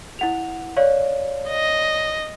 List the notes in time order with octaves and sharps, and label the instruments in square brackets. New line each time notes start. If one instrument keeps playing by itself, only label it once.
[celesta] E4 F#5 F7
C#5 D5 F5
[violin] D#5